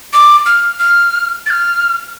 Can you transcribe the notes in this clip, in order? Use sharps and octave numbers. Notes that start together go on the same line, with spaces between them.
D6
F6
F6
A6
F6